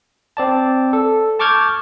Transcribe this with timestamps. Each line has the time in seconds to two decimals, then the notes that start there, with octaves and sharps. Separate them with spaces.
0.37 C4 D5 A5
0.93 A4
1.39 A5 C#6 D6 F6 G6 G#6